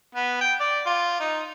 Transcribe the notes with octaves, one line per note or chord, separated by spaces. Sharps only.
B3
G5
D5
F4
D#4